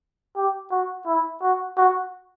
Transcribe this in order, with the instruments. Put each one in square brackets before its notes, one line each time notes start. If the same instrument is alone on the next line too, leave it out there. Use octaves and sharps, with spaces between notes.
[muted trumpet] G4
F#4
E4
F#4
F#4